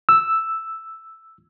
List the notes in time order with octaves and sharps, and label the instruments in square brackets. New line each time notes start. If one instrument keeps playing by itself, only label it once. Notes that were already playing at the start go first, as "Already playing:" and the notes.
[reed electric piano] E6